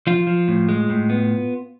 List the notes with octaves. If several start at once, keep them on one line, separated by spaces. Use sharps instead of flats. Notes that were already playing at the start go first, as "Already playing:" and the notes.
F3 F4
F3
A2
G#3
A2
B3